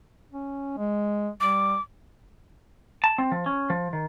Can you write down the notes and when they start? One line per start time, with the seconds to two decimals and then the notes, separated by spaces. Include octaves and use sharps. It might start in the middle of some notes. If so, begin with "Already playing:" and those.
0.31 C#4
0.78 G#3
1.40 G3 D6
3.04 A5
3.18 C4
3.32 F3
3.46 C#4
3.70 F3
3.93 D#3